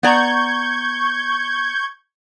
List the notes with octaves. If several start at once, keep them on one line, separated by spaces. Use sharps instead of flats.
B3 D5 A#5 C#6 G6 G#6